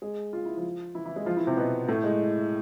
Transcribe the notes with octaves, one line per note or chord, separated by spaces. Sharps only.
G#3 G#4
F4
E4
F3 F4
E3 E4
E3 E4
G#3 G#4
F3 F4
E3 E4
C3 C4
B2 B3
A2 A3
G#3